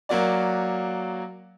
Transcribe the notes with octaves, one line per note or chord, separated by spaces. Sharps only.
F#3 A#3 F#4 D5